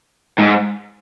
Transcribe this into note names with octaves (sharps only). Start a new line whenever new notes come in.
G#2